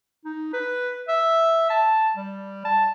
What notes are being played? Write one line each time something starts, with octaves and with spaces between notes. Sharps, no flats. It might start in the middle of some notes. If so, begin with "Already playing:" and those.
D#4
B4
E5
A5
G3
A5